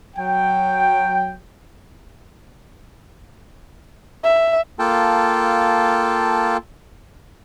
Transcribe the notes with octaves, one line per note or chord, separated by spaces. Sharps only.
F#3 G5
E5
A#3 F4 A4 G5 A5